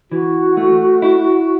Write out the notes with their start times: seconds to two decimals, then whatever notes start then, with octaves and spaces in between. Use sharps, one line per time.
0.11 E3 F#4
0.57 A3
1.02 E4